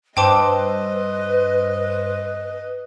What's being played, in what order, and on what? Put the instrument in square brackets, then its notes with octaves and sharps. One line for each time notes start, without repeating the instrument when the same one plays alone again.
[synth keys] G2 C5 E6 [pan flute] B4 [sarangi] D#5 [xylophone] G5 A5 D6